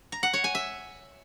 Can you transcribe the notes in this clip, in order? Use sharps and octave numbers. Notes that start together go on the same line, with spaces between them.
A#5
F#5
C#5
G#5
E5